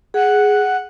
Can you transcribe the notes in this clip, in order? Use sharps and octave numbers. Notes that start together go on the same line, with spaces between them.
G#4 F#5